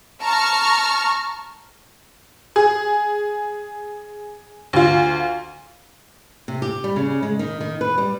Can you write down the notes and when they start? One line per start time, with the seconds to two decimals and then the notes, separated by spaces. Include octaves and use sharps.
0.23 A5 A#5 C#6 F6
2.56 G#4
4.73 D2 F4
6.48 C3
6.62 G4
6.84 G3
6.96 C#3
7.22 G#3
7.39 D#3
7.61 D#3
7.81 B4
7.98 G3